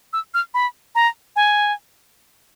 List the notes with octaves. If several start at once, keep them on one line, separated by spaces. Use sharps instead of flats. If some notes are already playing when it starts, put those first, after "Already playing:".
E6
F6
B5
A#5
G#5